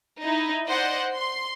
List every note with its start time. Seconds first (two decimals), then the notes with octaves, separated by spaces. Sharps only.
0.20 D#4 E4
0.68 C5 D5 D#5 F#5
1.14 C6